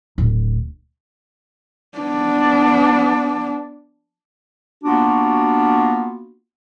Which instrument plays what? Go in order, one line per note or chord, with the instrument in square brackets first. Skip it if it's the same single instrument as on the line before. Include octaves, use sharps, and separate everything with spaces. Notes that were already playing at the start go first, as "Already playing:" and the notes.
[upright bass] D1
[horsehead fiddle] B3 D4
[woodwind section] A#3 B3 D4 F4 F#4